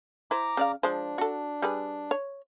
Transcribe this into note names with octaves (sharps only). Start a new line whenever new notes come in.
E4 C5 A#5 D6
C#3 D5 F5
F3 G#3 D4 C5
F#4 A4
G3 G#4 B4
C#5